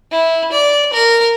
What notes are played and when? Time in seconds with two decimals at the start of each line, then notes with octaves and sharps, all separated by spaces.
0.11 E4
0.52 D5
0.93 A#4